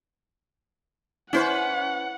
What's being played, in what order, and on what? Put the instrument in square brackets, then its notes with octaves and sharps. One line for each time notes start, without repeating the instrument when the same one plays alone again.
[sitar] C#4 B4 [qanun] E4 C5 [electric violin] F#5